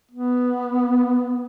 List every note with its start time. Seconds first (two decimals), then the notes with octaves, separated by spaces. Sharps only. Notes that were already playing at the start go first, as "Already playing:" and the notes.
0.12 B3